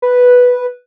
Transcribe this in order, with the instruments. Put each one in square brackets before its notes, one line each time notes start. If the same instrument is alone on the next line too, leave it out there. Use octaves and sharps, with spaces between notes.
[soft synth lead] B4